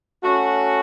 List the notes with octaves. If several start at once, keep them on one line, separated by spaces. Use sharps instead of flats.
A3 C#4 F#4